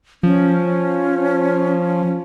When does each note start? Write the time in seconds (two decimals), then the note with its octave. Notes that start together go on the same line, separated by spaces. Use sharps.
0.23 F3 C#4